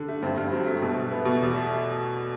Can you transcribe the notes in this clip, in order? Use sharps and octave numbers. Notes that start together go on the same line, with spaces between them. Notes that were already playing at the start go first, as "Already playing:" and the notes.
Already playing: D3
A3
G2 C4
G2
F#3 C4
A3
B2
A3
A3 B3
B2
E2
A3